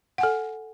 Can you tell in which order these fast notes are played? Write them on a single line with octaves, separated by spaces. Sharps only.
F#5 G#5 A4